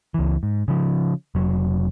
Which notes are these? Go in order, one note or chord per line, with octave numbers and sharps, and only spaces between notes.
C#2 E3
G#2
C#3 F3
F1 F#3